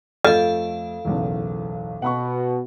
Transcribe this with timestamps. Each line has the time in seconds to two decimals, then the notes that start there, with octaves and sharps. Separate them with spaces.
0.25 F2 A3 A4 D#5 F5 G6
1.05 F#1 B1 E2
2.02 B2 F#5 B5 C#6